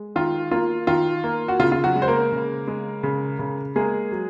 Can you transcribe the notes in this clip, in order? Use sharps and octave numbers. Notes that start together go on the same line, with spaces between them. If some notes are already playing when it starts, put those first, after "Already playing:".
Already playing: G#3
D#3 F4
A#3 F4
D#3 F4
A#3
F#4
C#3 F4
F4
F#3 F#4
G#3
C5
A#3 A#4
C#3
G#3
C#3
C#3
G#3 A#3 G#4
F#3